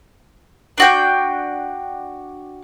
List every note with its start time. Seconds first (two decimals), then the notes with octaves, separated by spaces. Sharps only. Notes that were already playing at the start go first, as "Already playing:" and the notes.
0.78 D4 F#4 G5